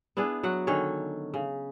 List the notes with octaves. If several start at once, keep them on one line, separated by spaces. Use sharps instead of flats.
B3 D4 E4 G#4
F#3 F#4 F#5
D3 D#3 C#4 C#5
C#3